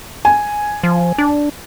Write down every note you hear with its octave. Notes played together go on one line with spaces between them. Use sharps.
G#5
F3
D4